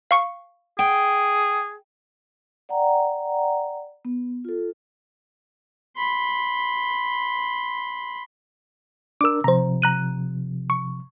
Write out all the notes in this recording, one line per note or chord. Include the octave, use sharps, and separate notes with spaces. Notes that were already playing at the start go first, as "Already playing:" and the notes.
F5 C#6 C#7
G#4 G5
D5 F#5 G5 A#5
B3
F4 A4
B5 C6
D4 A#4 D6 E6
C3 F3 C5 A#5
A#5 F#6 D#7
C#6